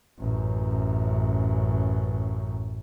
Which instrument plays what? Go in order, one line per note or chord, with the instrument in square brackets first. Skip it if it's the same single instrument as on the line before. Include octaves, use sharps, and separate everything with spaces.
[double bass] A1 F#2